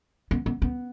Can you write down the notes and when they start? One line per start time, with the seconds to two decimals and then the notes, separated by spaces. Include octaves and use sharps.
0.31 B3
0.46 B3
0.62 B3